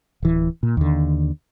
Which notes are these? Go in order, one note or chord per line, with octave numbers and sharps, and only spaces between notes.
D1 E3
A#2
D#2 D3